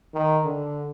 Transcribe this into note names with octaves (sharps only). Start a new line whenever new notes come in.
D#3
D3